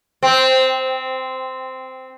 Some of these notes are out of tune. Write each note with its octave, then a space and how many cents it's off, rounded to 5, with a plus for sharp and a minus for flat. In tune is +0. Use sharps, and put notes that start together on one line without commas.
C4 -10